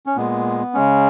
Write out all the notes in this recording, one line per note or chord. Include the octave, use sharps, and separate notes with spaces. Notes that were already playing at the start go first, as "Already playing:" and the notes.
C#4
A#2 G#3 B3
C#3 G#3 C#4